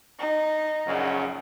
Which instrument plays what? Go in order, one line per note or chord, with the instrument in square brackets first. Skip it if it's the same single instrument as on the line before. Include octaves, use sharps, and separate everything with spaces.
[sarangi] D#4
[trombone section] A#1 F#2 C#3